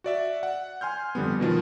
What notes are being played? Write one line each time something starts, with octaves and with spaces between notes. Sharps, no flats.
F#4 D5 E5
F#5
G#5 C6 F6 G6
F2 D3 G3 B3
B2 D#3 F3 G3